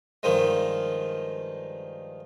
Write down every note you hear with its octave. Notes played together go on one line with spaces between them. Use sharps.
G2 D#3 F3 G#3